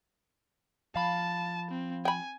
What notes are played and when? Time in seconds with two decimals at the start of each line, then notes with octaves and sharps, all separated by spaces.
0.96 F3 F5 A5 B5
1.71 C4
2.05 G5 G#5 B5